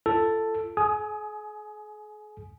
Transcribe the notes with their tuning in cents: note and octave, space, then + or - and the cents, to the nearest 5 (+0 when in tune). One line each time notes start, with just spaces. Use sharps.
F4 -40 A4 +5
G#4 +40 G#5 +25 D#6 +0